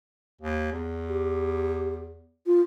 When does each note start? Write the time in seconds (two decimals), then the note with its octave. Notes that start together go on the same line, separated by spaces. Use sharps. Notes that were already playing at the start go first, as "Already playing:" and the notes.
0.41 D#2
0.72 E2
1.09 G4
2.46 F4